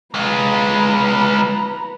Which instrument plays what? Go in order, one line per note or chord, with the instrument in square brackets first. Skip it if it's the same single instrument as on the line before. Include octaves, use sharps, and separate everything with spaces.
[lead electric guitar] G#3 F4 [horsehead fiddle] B4 A#5